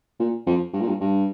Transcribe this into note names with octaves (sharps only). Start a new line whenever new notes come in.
A#2
F2
G2
A#2
G2
G2